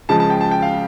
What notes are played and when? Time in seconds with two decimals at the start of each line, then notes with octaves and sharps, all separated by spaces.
0.09 C#2 C#3 F3 A5
0.20 A5
0.30 G5
0.41 A5
0.51 G5
0.62 F5